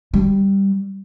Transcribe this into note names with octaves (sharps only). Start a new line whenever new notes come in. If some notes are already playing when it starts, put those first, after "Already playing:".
G3